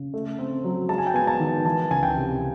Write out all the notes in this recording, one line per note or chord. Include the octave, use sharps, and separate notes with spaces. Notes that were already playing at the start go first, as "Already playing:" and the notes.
Already playing: C#3
A3
C4
F#3
G#3 A5
G#5
G5
B3 G#5
A5
D#3
E3 A5
C#2 G#5
G5
C3